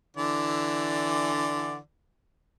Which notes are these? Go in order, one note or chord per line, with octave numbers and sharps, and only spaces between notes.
D3 E3 D5